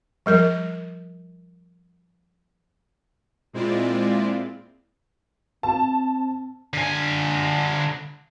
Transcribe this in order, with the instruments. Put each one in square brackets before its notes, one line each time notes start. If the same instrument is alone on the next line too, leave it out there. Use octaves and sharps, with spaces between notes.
[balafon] F3 G3 A#4
[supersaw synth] A#2 G#3 C4 E4 F4 D5
[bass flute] C4 [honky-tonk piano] A5
[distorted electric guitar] D3 G#5